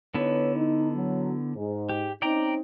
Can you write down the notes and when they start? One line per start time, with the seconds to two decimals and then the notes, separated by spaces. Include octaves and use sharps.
0.14 D3 B3 D#4 E4 B4 C#5
0.55 D#4
0.94 F#3
1.55 G#2
1.89 G4
2.22 C4 C#4 D#4 D5 G5 A#5